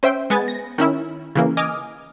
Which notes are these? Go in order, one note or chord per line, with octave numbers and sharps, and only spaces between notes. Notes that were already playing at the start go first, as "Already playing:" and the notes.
C#4 C5 E5 G5
G#3 B3 G#5 A6
A#6
D#3 C#4 E4
C#3 E3 A#3
D#5 G#5 D6 D#6 F6